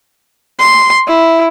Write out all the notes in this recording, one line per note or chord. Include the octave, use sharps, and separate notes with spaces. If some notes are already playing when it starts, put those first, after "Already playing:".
C6
E4